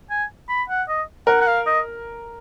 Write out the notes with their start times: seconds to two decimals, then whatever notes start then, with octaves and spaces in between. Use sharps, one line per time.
0.10 G#5
0.48 B5
0.69 F#5
0.88 D#5
1.27 A#4 F#5
1.41 F#5
1.47 F5
1.66 D#5